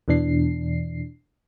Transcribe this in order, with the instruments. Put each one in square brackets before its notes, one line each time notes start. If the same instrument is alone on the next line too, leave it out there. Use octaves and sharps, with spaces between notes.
[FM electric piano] E2 B2 E3 D4 C7